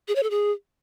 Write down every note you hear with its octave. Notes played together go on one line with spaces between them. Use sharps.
G#4
C#5
A4
G#4